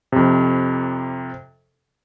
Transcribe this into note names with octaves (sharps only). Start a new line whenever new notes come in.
F2 C3